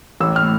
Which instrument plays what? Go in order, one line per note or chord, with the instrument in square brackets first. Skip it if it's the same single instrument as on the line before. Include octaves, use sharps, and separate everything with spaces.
[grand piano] A1 E6
F6
A2